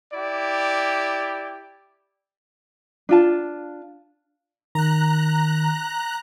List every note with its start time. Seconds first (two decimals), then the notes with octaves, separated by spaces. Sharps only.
0.13 E4 G4 D5
3.09 D4 F4 A5
4.75 D#3 A#5 F#6